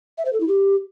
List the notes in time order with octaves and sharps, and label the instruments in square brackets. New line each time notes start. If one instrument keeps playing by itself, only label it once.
[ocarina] E5
C5
A4
E4
G4